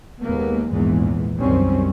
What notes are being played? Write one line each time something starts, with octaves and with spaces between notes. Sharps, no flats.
D#2 G#3 A#3 B3
A#1 E2 G#2 E3 G#3
C2 F#2 D#3 G3 C4 C#4